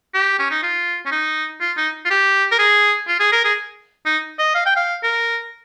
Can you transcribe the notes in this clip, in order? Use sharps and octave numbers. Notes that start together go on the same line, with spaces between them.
G4
C#4
D#4
F4
C#4
D#4
F4
D#4
F4
G4
A#4
G#4
F4
G#4
A#4
G#4
D#4
D#5
F5
G5
F5
A#4